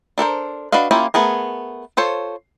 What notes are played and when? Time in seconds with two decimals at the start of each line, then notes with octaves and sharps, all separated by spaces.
0.18 D4 A4 A#4 C5
0.72 D4 F#4 B4 D#5 F5
0.91 A#3 C#4 E4 F4 G4
1.14 A3 B3 G#4 A#4
1.97 F4 A4 C5 C#5